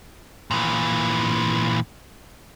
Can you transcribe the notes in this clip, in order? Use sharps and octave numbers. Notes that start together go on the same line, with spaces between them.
A#2 E3